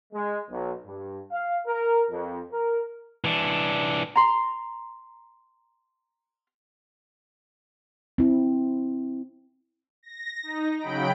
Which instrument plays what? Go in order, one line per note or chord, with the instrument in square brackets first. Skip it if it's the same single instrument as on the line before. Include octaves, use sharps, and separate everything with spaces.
[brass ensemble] G#3
B1
G2
F5
A#4
F2
A#4
[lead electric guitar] E3 D4
[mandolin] A#5 C6
[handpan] C4 E4
[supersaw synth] A#6
D#4
C#3 F#3 G5 B5 D7